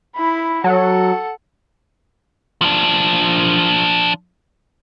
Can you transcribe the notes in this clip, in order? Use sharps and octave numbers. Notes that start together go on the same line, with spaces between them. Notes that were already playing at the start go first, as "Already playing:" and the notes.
E4 B5
F#3 A4 F#5
F3 D4